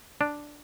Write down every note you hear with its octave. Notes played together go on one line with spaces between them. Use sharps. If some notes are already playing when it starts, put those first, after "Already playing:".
D4